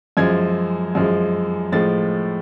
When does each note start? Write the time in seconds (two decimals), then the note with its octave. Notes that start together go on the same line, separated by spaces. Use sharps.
0.17 F#2 F3 G#3 G#6
0.95 F#2 F3 G#3
1.72 A2 F3 G#3 A6